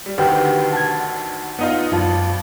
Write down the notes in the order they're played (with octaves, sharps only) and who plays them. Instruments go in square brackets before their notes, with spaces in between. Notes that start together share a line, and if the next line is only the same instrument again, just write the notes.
[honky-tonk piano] G3
[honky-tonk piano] D2 D3 D#3 [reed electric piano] G4 B4 G5
[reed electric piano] A5 G#6
[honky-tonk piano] B3 D#4 F4
[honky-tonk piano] G#1 [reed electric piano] F#2 F4 A5